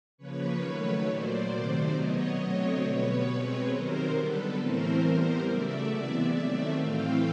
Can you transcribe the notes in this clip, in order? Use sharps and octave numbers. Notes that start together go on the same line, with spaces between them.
C#3 F3 A#3 B4 C#5
D#3 F#3 A3
A#2 F#3 A#3 C5 D5
C3 D#3 F#3 A3
B2 F#3 B3 C#5 D#5
D3 F#3 A3 C4 C#5 D#5
B2 G3 B3 B4 C#5
B2 G#3 C4
C3 D#3 F#3 A#4 C5
D3 G3 B3 A4 B4
A2 E3 A3 C4 A#4 C5
E3 G3 B3
C#3 F#3 A3 D5 E5
C3 E3 G#3 B3
D#3 F#3 A3 C4
A2 E3 A3 C4 F5 G5